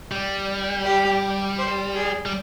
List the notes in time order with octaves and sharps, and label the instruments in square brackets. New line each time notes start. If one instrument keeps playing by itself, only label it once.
[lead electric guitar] G3
[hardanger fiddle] G4
C5
G#4
[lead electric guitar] G3